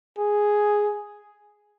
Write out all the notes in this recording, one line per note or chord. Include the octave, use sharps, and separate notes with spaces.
G#4